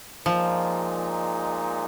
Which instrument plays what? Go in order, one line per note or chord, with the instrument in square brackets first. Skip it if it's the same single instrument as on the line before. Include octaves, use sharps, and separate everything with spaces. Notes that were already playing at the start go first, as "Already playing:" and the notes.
[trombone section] A#2 G#3 D#4 [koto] F3